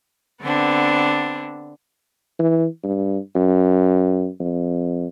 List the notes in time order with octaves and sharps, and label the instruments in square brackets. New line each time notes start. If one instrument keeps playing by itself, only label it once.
[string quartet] D3 B3 C4 D4
[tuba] E3
G2
F#2
F2